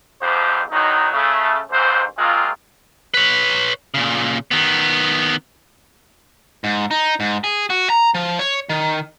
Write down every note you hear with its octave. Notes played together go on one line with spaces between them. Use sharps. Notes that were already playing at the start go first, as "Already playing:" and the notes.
B1 F2 G#2 F3 G3 C5
E2 D#3 F#3 D#4
C#3 A3
A1 D#2 G#2 E3 C5
F#3 G#3 A#3 C4 F4
B4 C#5
A#2 C#3
D#3 B3
G#2
D#4
G#2
G#4
F#4
A#5
F3
C#5
D#3